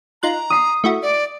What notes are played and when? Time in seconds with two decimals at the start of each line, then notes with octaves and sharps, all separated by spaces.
0.23 D#4 F4 A#5 F#6
0.50 D#6 C7
0.84 A3 E4 F#4
1.03 D5